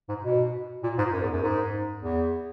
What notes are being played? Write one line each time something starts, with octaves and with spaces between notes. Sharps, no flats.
G#2
B2
A#2
G#2
F#2
E2
F#2
G#2
E2